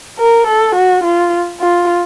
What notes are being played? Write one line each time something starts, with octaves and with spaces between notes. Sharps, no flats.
A#4
A4
F#4
F4
F4